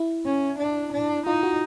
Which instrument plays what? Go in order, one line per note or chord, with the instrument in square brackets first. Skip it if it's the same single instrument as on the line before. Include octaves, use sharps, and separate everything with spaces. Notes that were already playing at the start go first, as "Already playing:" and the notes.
Already playing: [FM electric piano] E4
[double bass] C#4
D4
D4
[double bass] D#4 [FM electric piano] F4
[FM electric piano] F#4